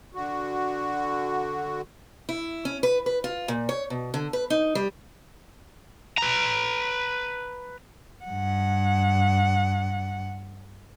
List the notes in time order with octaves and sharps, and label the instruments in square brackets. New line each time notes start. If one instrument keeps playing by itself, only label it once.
[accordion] D3 F#4
[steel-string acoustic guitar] E4
C#4
B4
B4
F4
A#2
C#5
B2
D3
B4
D#4
G3
[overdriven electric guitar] B4 A#5
[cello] G2 F#5